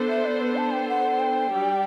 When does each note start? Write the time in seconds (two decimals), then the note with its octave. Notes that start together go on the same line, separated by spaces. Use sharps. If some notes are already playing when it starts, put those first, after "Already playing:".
Already playing: B3 D4 A4 C5
0.09 E5
0.26 D5
0.41 B4
0.57 A5
0.72 G5
0.89 F#5
1.20 G5
1.51 G3 D4 G4 D5